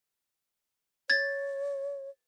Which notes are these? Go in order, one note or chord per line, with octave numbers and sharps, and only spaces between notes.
C#5 G#6 A6